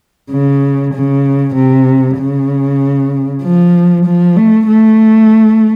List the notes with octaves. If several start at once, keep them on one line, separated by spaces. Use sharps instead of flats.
C#3
C#3
C3
C#3
F3
F3
A3
A3